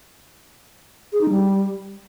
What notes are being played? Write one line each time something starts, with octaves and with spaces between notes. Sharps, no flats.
G#4
D#4
G3